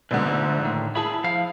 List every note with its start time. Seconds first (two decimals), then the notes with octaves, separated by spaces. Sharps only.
0.11 A#1 G#2 B2 D3
0.27 D2
0.61 A2 D#3
0.95 E4 G#4 A5 B5
1.24 F3 F5